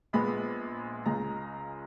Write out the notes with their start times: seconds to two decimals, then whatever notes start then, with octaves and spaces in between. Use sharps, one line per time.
0.13 A#1 A#2 G#3 B3 B5
1.06 C#2 C#3 G#3 A#5